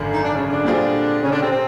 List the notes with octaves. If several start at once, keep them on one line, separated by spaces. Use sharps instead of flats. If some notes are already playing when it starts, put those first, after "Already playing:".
Already playing: G#1 F#2 D3
D#4
D4
C#3 C#4
D3 D4
A#2 G3 C4 F4 G#4
C#3 C#4
D3 D4
C3 C4
C3 C4